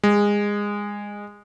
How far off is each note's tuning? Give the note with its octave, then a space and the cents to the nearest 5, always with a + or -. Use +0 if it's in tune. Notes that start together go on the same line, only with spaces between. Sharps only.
G#3 -20